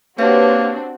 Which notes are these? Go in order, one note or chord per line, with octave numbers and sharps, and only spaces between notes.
A#3 C4 D4 F#4 G4 B4 C#5